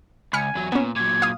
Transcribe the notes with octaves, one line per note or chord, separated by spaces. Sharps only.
C#2 G#5 B5 F6 C#7
E2 F#3
A#2 B3 C#4
A#2 F#3 G#6
F5 D#6